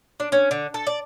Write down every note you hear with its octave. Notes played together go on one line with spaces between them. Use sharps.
D4
C#4
D3
A4
D5